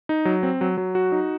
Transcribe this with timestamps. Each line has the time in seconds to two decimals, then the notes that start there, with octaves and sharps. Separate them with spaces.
0.09 D#4
0.25 F#3
0.43 C4
0.61 F#3
0.77 F#3
0.95 F#4
1.12 D#4